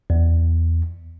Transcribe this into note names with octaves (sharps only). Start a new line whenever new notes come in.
E2